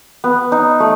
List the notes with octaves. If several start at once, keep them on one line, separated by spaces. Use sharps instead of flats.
B3
D#4
A3